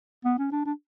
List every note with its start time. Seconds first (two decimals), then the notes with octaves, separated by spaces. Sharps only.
0.25 B3
0.38 C#4
0.52 D4
0.65 D4